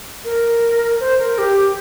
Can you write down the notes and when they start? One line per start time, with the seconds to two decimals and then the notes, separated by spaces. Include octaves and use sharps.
0.25 A#4
1.00 C5
1.19 A#4
1.38 G4